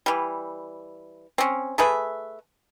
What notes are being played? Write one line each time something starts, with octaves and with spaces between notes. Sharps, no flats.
E3 G3
C4 C#4
A3 G#4 B4 E5